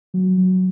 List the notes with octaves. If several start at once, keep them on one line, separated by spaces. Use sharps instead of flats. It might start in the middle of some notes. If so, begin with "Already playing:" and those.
F#3
F#3